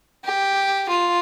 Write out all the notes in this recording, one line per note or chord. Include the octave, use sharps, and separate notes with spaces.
G4
F4